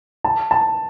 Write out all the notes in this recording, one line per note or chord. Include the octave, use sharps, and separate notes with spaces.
A5
A5